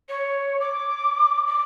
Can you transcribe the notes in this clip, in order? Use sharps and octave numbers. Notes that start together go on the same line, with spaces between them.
C#5
D6
D6